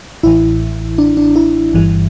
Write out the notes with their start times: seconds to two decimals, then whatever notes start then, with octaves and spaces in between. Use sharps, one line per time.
0.23 A1 A2 E3 E4
0.98 D4
1.17 D4
1.36 E4
1.73 G1 G2 E3